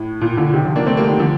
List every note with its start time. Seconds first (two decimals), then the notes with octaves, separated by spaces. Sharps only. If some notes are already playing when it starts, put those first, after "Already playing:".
Already playing: A2
0.21 A#2
0.37 A#2 D3
0.54 C3 D#3
0.65 D3 F3
0.76 A#3 D4
0.86 A3 C4
0.97 G3 A#3
1.09 D#3 G3
1.19 D3 F3